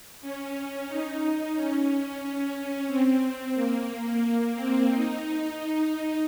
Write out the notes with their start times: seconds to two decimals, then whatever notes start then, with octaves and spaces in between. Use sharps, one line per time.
0.22 C#4
0.88 D#4
1.55 C#4
2.88 C4
3.55 A#3
4.54 C4
4.88 D#4
5.21 D#4